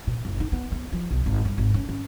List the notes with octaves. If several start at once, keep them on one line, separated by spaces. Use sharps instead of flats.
A#2
F#1
D#4
B3
B3
F3
B1
G#1
G2
G#1
C#4
C#4